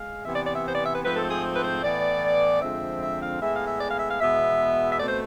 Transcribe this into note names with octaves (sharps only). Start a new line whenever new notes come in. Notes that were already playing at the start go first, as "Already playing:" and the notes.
Already playing: G#3 F5
C3 E3 B3 E5
D5
D5
E5
C5
D5
E5
B4
G#2 F3 A3 C4 B4
A4
G#4
B4
C5
A2 E3 B3 D5
F2 D3 F3 G#3 C4 E5
E5
F5
A2 G#3 B3 E5
F5
E5
D5
F5
E5
F5
E2 B2 G#3 B3 E5
E5
B2 A3 C4 D5
C5